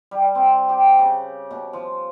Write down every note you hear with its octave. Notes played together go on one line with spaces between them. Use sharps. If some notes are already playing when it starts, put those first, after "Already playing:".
G3
C4
G4
C#3
B2
F3